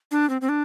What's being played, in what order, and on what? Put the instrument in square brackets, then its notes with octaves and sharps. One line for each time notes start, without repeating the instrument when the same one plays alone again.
[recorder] D4
C4
C4
D4